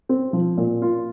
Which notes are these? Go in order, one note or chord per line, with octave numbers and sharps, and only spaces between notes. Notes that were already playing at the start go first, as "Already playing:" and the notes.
C4
F3
A#2
F4